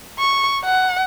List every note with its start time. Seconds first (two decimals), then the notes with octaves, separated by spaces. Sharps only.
0.19 C#6
0.65 F#5